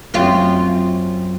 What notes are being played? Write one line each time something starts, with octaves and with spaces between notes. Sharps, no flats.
F#2 C4 F4